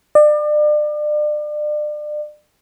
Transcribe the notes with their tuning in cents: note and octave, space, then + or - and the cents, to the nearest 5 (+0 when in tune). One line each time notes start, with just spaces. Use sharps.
D5 +35